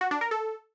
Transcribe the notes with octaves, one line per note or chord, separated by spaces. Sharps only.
F#4
D4
A#4
A4